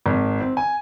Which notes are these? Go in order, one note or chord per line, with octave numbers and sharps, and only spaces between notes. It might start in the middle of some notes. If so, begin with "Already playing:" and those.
G#1
C4
G#5